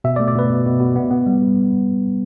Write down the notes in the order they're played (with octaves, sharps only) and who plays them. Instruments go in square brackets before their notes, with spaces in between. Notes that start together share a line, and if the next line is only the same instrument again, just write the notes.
[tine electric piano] B2 E5
D5
A3
D5
B2 B4
B2
B2
B2
B3
B3
G3